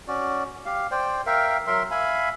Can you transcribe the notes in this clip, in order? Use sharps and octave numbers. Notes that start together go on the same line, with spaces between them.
C#4 F#4 D5
G4 F5
C5 D5 G5
A#4 E5 F5 G5
F#3 A#4 E5 C6
E5 F5 G#5 B5